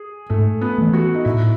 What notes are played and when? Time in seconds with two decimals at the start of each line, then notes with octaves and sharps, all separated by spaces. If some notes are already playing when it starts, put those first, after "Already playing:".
Already playing: G#4
0.30 G#2 A3
0.61 B3
0.78 E3 A3
0.93 F#4
1.14 D#4
1.25 A2 E4